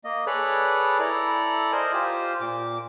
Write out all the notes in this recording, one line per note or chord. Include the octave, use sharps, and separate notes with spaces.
A#3 D#5
G#4 A4 B4 C#5 D5 B5
E4 A4 D5 A#5
A#4 C5 D#5 G#5
F4 G4 C5
A#2 D6